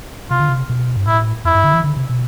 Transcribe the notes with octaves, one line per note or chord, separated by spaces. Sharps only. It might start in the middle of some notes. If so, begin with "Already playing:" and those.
C3 F4
D3
C3
B2
G2
A2 E4
F2 E4
G2
D3
E3
D3
C3
B2